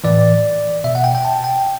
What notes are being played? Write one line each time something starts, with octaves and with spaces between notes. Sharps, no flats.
A2 E3 D5
B2 E5
F#5
G5
G5
A5
G5